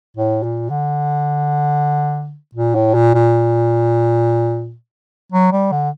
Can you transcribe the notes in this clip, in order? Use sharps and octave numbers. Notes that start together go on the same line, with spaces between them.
A2
A#2
D3
A#2
A2
A#2
A#2
F#3
G3
D3